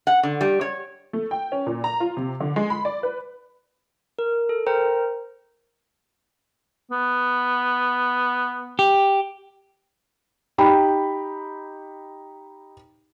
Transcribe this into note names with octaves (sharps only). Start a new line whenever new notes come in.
F#5
D3
G3
C#5
A3
G5
C#4
A#2
A#5
F4
C3
D3
G#3
B5
D5
B4
A#4
A4
A#4 C5 G5 A#5
B3
G4
D#4 G4 G5 B5